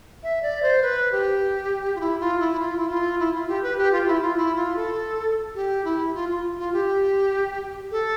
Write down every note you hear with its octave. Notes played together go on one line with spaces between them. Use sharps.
E5
D5
C5
B4
G4
F4
E4
F4
E4
F4
E4
F4
E4
F4
G4
B4
G4
F4
F4
E4
F4
E4
F4
A4
G4
E4
F4
F4
F4
G4
A4